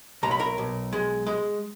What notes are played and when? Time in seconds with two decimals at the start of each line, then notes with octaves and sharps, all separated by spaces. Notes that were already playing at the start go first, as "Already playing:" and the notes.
0.23 B1 A#5
0.31 B5
0.40 A#4 A#5
0.58 B1
0.93 G#3
1.27 G#3